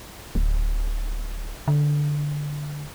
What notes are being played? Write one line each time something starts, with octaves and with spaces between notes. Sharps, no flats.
D1
D3